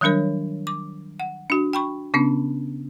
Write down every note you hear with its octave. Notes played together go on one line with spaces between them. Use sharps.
D#3 F#3 G3 D4 A#4 C#5
D6
F#5
D4 F#4
G5 B5 C#6
C#3 B3 C#4 D4